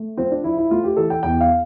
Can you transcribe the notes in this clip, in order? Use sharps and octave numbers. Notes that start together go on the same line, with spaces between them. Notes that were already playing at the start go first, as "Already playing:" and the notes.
Already playing: A3
F3 C4
D4
F3 E4
E4
A3 F4
G4
E3 A4
G5
E2 G5
F5